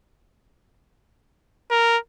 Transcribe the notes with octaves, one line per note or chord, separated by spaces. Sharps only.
A#4